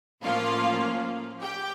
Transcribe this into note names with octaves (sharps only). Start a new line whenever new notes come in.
A2 F3 A#3 C#4 F4 F5
G4 G5